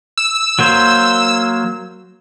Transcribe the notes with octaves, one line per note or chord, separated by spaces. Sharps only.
E6
F#3 A#3 C5